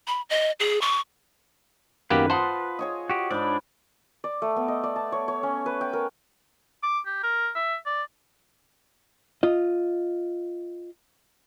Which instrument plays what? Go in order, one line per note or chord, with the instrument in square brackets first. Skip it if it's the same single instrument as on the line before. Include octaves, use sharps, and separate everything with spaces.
[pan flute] B5
D#5
G#4
C#6
[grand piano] F#2 D#3 [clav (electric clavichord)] A#3 B3 G4 [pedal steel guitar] B4
[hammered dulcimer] F4 [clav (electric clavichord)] C5 F#5 [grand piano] A5 D#6
[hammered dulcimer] G#4 C#5 D#5
[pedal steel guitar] F#4 G4
[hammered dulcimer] G#2 B5 [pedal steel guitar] D4 D5
[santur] D5
A3
B3
D#5
D5
A5
C#5
C#5
C#4
B4
G5
A#4
[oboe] D6
G4
A#4
E5
D5
[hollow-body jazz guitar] F4 D#5